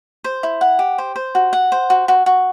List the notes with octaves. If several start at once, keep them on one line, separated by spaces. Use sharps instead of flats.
C5
E4
F#5
G4
C5
C5
F#4
F#5
C5
F#4
F#4
F#4